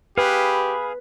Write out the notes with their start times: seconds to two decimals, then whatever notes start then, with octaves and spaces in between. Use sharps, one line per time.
0.18 G4 G#4 B4 F5 B5